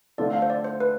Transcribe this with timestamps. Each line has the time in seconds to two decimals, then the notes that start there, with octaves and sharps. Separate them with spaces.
0.18 D3 A3 C4 F4 A4 D5
0.33 F5
0.42 C5
0.50 D5
0.64 C5
0.80 B4